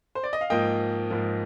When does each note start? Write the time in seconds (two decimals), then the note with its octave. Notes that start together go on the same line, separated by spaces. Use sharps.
0.15 C5
0.23 D5
0.33 D#5
0.41 F5
0.50 G#2 F3 A#3 D#5 G5
1.10 G#2 F3 A#3